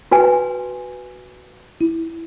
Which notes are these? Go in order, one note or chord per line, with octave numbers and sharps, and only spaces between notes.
F#4 B4 G#5
E4